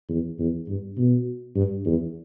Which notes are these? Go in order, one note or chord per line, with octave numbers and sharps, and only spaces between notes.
E2
E2
G2
B2
G2
E2